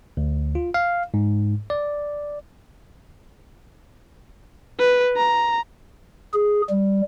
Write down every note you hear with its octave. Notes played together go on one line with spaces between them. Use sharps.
D2
F4
F5
G#2
D5
B4
A#5
G#4
G3